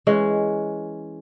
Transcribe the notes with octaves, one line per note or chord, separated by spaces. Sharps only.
E3 G#3 C#4